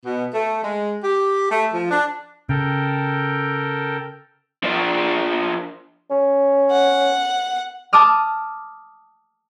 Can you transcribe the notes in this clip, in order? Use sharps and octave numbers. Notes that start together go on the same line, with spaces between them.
B2
A3
G#3
G4
A3
F3
D4
C#3 A4 A#4 G5
F3 D4
C#4
F#5
A5 D6 D#6 F6